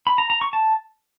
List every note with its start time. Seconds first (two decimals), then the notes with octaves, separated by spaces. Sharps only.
0.07 B5
0.18 A#5
0.30 A#5
0.41 C#6
0.53 A5